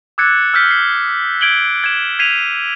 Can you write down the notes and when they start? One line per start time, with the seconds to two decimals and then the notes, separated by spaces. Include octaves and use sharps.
0.18 D6 E6 F#6 G#6 A6 C#7
0.54 E6 F6 G6 B6
0.71 C7
1.41 G6 G#6 D7 F#7 G7
1.84 G#6 E7
2.19 G#6 B6 C7 D#7 F7